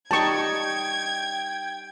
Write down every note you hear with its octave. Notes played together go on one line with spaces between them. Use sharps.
G3 D#4 G5 A5 C#6 G#6